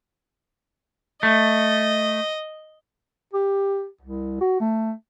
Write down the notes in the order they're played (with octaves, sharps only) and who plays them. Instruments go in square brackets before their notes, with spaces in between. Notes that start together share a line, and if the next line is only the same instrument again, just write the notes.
[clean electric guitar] A3 [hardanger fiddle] D#5
[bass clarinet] G4
C2
F#4
A3